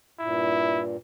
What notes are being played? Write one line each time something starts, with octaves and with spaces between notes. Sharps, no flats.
G2 A#2 E4